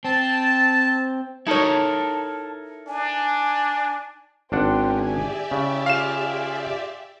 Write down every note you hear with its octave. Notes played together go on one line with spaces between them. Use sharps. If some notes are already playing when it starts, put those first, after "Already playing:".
C4 A5
D#4 E4 A4 A#4 C#5 A5
D4 G#5
G#1 C#4 D4 C5 F#5 G5
G4 G#4 D5 E5 G#5
C#3 E4
F4 G#4 F5 E7